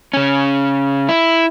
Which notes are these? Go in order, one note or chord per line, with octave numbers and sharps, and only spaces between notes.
C#3 C#4
E4